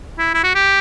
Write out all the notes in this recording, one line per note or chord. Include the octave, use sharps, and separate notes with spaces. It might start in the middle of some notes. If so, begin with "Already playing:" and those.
E4
E4
F#4
G4